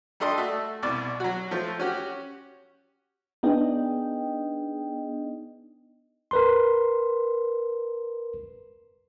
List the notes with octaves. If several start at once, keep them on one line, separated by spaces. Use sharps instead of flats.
G3 D4 A4 D#5 C6
A3 F#4 E5
C2 B2 D5
F#3 F#4
F3 A3 C5
C#4 F#4 G4
B3 D4 D#4 G#4 D#5 G5
A#4 B4 C6